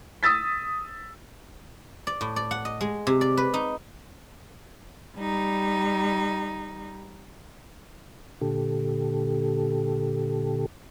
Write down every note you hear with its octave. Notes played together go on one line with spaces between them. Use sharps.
D#6 E6 A6 B6
D5
A2
D5
F#5
D#5
G#3
C3
D5
B4
D#4
G3 D#4
A#2 D3 G4 A4